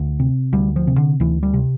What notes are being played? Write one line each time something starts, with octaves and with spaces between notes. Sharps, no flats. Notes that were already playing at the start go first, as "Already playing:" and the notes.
Already playing: D2
C3
D2 G3
F3
C3
D3
D2 E3
G3
C3